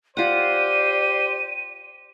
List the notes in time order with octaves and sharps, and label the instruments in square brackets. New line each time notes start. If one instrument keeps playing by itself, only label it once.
[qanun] F4 F#5 [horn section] G4 C5 [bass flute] D5 [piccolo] D#7